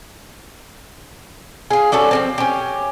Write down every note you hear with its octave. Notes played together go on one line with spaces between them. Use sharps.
F4 G#4
G3 C#4 F#4 A4
F3 A#3 C4
C#4 G4